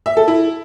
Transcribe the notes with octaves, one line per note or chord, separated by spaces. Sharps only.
E5
A4
E4